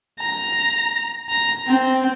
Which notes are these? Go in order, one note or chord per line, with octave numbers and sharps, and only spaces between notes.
A#5
A#5
C4